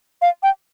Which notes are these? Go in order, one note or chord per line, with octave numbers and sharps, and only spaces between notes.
F5
G5